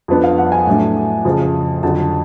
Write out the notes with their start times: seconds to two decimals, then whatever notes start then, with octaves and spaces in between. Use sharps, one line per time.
0.08 F2 F3 B3 D4
0.23 F5
0.38 F#5
0.52 G#5
0.67 A2 F#3 A3 D4
1.25 F2 C#3 F3
1.83 F2 D3 F#3 A5